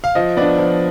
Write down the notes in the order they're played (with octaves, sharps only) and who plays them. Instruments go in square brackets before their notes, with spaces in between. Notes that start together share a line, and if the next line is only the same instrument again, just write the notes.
[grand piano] F5
F3 D#5
B3 D4 D5
F3